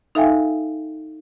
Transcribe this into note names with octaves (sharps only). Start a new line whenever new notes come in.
D#4 A4 E5 F5 G5 G#5